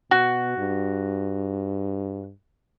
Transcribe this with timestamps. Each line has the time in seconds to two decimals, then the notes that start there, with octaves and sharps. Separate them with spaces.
0.11 B2 F#4
0.58 G2